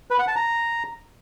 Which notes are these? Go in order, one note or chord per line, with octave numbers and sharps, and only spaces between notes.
B4
F#5
A5
A#5